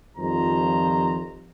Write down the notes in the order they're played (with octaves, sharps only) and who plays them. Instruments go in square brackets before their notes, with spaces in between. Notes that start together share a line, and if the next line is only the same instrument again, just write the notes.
[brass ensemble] F2 D#3 F3 G3 C5 A#5